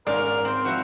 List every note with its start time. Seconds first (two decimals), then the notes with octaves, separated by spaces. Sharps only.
0.07 G#2 C#4 A#4 D5 F5
0.45 C4 G5
0.65 F3 E4 F#4